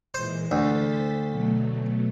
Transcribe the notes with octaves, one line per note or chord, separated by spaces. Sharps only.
A#2 E3 G#3 C5
D2 C5 A6 B6
B2 F#3 A3